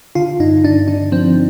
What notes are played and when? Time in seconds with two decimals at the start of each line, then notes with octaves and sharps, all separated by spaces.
0.15 D3 F4
0.40 G2 D#4
0.64 D3 D4
0.88 D3 D4
1.12 F3 C4